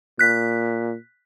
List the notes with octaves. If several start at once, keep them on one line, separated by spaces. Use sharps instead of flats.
A#2 F#6 B6